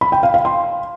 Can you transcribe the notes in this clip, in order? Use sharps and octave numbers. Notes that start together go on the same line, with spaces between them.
B5
G5
F5
F5
C6